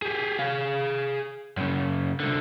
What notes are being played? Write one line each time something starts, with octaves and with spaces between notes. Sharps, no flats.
G4 G#4
G#4 F5
F#2 C#3
C2 D3